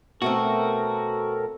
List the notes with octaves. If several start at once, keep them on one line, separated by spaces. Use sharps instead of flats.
B2 A3 C4 F#4 A4 A#4